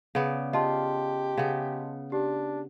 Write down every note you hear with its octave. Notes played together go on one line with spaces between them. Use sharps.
C#3 B3 D5
F4 G4 D#5 A5 C6
C#3 B3
D4 G4